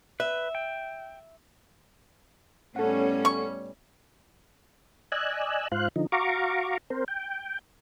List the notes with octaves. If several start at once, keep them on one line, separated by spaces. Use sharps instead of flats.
B4 E5
G5
A2 G3 B3 C#4 A4 F#5
C#6
D5 D#5 G#5 E6 F#6
G#2 F4 C5 F5 F#6
D3 F3 D#4
F#4 F5 A#5 C#6 D6
C4 A#4 C5
G5